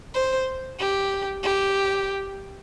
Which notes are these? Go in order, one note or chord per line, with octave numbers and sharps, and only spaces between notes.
C5
G4
G4